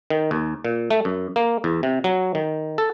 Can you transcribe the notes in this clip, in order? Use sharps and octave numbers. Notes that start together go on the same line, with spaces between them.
D#3
D#2
A#2
A3
F#2
A#3
E2
C3
F#3
D#3
A4